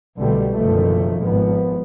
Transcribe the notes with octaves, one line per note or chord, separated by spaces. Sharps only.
C2 B2 D3 G3 A3
F#1 B2 D3 D#3 F3 A3
G#1 F3 B3